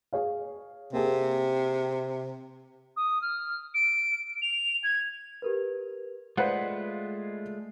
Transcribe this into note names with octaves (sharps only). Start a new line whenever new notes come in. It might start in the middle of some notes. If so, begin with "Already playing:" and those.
G#4 C#5 F5
C3 A#3 G#4
D#6
F6
D7
F7
G#6
G4 A#4 B4
G#3 A3 F4 B4 C5 D5 F5 F#5